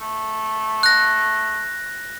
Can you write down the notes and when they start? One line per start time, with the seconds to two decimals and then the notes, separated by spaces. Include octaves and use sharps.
0.01 A3
0.83 F#6 A#6